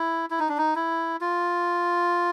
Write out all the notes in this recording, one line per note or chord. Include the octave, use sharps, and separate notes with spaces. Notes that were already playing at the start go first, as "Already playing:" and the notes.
Already playing: E4
E4
D#4
D4
D#4
E4
F4